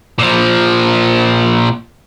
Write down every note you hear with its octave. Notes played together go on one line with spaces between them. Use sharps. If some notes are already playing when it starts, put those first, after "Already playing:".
A#2 F3